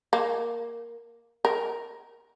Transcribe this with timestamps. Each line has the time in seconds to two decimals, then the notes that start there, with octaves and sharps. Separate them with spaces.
0.13 A#3
1.45 A#4